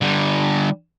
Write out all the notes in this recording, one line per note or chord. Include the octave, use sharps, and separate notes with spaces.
D3 G3